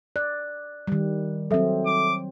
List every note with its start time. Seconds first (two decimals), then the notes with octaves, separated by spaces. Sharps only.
0.16 D5 F#6
0.88 D#3 G3
1.51 F#3 C4 A4 E5
1.86 D6